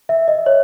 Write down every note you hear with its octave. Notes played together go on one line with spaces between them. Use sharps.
E5
D#5
C#5